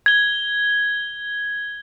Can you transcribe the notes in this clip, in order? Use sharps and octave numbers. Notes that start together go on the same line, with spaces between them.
G#6 G7